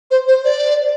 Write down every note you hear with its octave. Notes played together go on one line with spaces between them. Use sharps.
C5
C5
D5